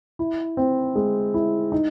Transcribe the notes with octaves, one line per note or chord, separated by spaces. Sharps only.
E4
C4
G#3
E4
D#4